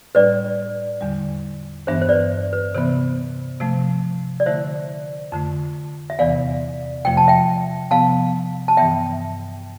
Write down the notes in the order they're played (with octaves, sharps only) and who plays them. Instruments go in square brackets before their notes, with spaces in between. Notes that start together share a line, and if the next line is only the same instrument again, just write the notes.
[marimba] A2 G3 D4 [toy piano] B4 D5
[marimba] E2 D3 G3
[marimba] G2 E3 B3 D4 [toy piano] C5 E5
[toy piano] C5
B4 D5
B4
[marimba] C3 E3 B3 [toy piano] C5
[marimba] C3 F3 A3
[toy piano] D5
[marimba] D3 A3 E4 [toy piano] C5 E5
[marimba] F2 D3 A3
[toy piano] E5
[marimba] E2 C3 E3 B3 [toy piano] D5 F5
[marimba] F2 C3 F3 A3 [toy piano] G5
[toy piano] A5
E5 G5
[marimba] C3 F3 B3 [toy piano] F5 A5
[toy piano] A5
[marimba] G2 E3 B3 [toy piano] E5 G5